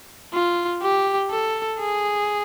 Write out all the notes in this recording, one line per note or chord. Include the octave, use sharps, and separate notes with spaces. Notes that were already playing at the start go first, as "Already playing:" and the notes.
F4
G4
A4
G#4